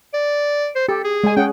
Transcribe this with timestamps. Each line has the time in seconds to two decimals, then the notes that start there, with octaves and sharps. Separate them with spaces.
0.14 D5
0.75 C5
0.88 G4 A4
1.04 G#4
1.24 G#3 G#5
1.37 C#4 G#4 F#5 G5